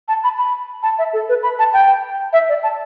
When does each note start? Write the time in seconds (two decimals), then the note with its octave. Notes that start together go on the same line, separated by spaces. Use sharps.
0.08 A5
0.24 B5
0.38 B5
0.83 A5
0.98 E5
1.13 A4
1.29 B4
1.43 B5
1.59 A5
1.74 G5
2.33 E5
2.49 D5
2.63 A5